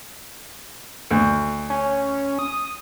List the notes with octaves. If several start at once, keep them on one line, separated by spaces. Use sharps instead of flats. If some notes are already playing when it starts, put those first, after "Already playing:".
D2
C#4
D#6